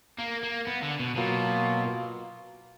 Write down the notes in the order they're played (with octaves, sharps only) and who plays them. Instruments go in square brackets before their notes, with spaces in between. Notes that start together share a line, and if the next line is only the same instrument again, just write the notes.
[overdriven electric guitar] A#3
A#3
B3
D3
B2
[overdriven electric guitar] B2 [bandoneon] F#3 A#3 F4